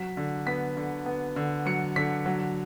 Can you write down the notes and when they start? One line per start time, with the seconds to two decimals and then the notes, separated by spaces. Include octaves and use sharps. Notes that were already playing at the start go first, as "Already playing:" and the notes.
Already playing: F#3 B6
0.17 D3
0.46 B3 B6
0.77 D3
1.06 B3
1.36 D3
1.66 F#3 C#7
1.96 D3 B6
2.26 F#3